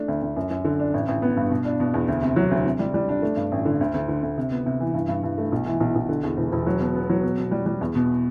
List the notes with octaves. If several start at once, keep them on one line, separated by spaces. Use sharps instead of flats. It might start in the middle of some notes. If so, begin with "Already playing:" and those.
Already playing: A3 D4
D2
D2
F#2
F#2
D3
D4
A1
A1
B3
G2
B2
D4
B2
E2
D2
C3
F#3
D2
C3
G3
G3
D4
A3
G2
A1
D3
D2
D2
D3
D2
C3
B3
C3
E3
G2
G2
G2
A3
B1
E3
B1
B1
D3
E2
E1
E1
F#3
B2
B3
F#3
B2
B2
G3
G3
E2
B2